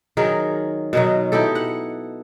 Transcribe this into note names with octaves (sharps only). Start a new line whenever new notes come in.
D#3 F#3 G#4 A#4
B2 D#3 F#3
D#4 E4 G4 A4
F#5